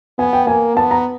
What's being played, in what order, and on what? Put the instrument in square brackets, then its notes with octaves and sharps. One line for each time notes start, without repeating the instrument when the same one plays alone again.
[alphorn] B3 [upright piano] G#5
[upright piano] G5
[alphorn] A#3 [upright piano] G#5
[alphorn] B3 [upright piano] A5
[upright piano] A#5